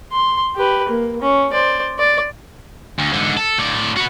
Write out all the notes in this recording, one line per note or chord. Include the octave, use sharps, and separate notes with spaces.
C6
G4 B4
A#3
C#4
C5 D5
D5
D2
G#2 D3
A4
A2 D5
F#4 B4